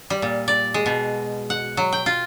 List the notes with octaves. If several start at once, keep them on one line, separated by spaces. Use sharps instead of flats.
G3
A#2
D5
G#3
B2
F#5
F#3
G5
F4